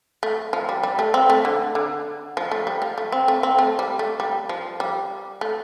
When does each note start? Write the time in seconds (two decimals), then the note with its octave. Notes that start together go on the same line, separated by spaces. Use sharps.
0.23 A3
0.53 F3
0.69 G3
0.83 G3
0.99 A3
1.14 C4
1.30 A3
1.45 D3
1.75 D3
2.37 F3
2.51 A3
2.67 G3
2.82 F3
2.98 A3
3.12 C4
3.28 A3
3.43 C4
3.59 A3
3.79 G3
3.99 A3
4.20 G3
4.49 F3
4.80 G3
5.41 A3